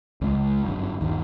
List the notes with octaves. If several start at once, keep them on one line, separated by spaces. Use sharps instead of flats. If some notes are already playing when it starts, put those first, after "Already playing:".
C#2 G#3
G1 F#2
G1 D#2